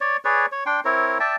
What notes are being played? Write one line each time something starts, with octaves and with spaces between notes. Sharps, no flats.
C#5 D5
G#4 B4 C#5 D5
C#5
D4 G5 C6
C4 E4 A#4 C#5
D5 E5 G5 A5